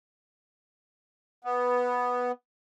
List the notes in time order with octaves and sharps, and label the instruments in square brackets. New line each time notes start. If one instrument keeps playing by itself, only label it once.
[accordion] B3